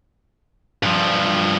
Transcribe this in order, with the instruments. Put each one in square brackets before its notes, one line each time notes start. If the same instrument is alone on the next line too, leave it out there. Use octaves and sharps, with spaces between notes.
[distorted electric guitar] G2 F3